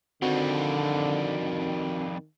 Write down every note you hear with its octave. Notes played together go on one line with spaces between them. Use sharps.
F2 D3 D#3 G3 C4 F#4